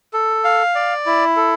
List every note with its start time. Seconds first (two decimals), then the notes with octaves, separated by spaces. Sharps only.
0.13 A4
0.44 F5
0.75 D5
1.06 E4
1.36 A4